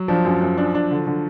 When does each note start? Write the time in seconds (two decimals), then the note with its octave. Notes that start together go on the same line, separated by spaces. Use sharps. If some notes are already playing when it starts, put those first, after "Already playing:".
Already playing: F#3
0.08 F3 D4
0.25 F#2
0.41 F#2
0.58 D4
0.75 D4
0.91 D3
1.07 D3